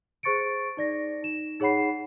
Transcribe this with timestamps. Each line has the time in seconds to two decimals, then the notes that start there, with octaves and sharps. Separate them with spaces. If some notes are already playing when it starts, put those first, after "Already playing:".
0.23 G#4 C5 C#6 A6 C#7 D7
0.77 D#4 D5 A#6
1.23 D#4 E7
1.60 D#4 G#4 C#5 F#5 B5 C7